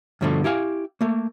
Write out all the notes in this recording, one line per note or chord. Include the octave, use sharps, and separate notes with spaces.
G2 B2 D3 F3 A3
E4 G4 F5 G#5
A3 A#3